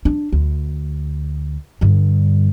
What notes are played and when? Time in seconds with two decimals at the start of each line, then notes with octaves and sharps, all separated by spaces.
0.05 D4
0.32 D2
1.81 G2 D3